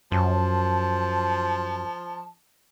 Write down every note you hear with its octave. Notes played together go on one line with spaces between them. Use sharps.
F#2 F3 A5